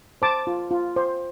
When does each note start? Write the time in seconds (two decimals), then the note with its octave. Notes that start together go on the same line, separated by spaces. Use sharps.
0.22 C5 A5 D6
0.47 F4
0.71 F4
0.96 C5